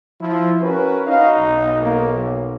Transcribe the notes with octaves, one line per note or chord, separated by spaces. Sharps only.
F3 E4
C#4 F#4 A#4 B4
D#4 F#4 D#5 F5
B1
A#3
F#3